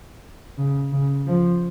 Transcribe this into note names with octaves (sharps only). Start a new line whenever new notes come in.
C#3
C#3
F3